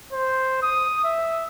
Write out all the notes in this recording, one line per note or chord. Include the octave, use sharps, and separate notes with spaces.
C5
D#6
E5